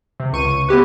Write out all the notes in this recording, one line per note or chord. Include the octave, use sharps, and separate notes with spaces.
C3
C#2 C#6 D#7
B3 E4 G4 B4